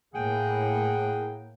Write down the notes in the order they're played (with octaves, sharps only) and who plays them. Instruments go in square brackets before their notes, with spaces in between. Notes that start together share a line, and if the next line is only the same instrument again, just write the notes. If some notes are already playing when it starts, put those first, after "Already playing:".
[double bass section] A2 A#3 [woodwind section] G#4 F#5 G5